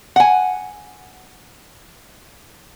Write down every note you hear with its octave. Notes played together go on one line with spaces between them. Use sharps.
F#5 G#5